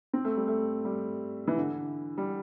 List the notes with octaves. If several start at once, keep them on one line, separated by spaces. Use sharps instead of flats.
C4
A3
G3
A3
G3
E3
D3
G3